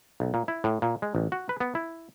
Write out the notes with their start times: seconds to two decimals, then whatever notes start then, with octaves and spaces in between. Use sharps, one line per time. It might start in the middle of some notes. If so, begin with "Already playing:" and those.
0.20 B1
0.34 A#2
0.48 E4
0.64 A2
0.82 A#2
1.02 G#3
1.15 A1
1.32 F#4
1.49 B4
1.60 B3
1.75 E4